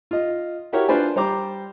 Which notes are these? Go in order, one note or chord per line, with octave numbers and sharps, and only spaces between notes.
F4 D#5
E4 F#4 G4 A#4 C#5
D4 F4 B4 C5 D5 G#5
G3 C5 A#5 D6